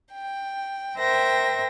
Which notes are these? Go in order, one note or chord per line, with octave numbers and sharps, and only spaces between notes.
G5
A#4 C5 E5 G5 A#6